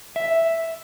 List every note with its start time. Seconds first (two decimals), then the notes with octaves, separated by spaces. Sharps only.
0.16 E5